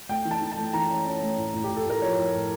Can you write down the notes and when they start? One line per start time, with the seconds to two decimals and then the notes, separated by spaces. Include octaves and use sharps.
0.09 A3 G5
0.25 E3
0.31 A5
0.42 E3
0.52 A5
0.58 A3
0.73 E3 A#5
0.89 C#4
1.06 C#4
1.22 A3
1.38 A2
1.54 A2
1.64 G4
1.70 A2
1.76 A4
1.86 A2 A#4
2.02 F3 C#5
2.18 A2
2.34 A2